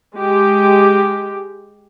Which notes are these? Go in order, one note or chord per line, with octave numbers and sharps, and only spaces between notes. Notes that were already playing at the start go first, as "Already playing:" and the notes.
G#3 G4